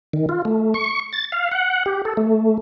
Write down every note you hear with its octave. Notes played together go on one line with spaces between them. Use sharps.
D#3
F4
A3
C#6
A6
F5
F#5
G4
A4
A3